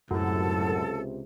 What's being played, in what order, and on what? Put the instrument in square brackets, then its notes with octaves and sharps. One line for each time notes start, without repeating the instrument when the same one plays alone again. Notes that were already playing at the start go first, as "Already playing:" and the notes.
[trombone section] C#2 C3 [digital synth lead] F#2 [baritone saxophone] A2 [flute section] A4